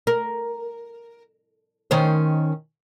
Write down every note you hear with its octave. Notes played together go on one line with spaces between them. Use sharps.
A#4
D#3 C#4 C5